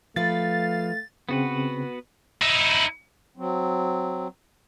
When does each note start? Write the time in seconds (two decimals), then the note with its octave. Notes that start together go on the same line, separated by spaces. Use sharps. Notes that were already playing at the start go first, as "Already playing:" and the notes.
0.16 F3 A3 B4 F5 A6
1.29 C#3 B3 C4 F#4 B4
2.42 D#4 E4
3.37 F#3 C4